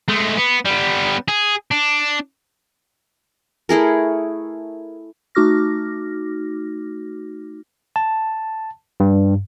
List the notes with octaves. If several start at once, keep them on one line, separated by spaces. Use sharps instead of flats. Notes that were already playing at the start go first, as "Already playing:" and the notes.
G#3 A3
B3
G3 B3
G#4
D4
A3 E4 G#4 A#4
A3 D#4 F#4 D6 F6 A#6
A5
G2